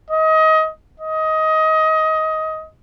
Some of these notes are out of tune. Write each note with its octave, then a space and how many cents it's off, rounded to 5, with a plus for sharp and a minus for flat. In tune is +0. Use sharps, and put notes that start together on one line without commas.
D#5 +25
D#5 +20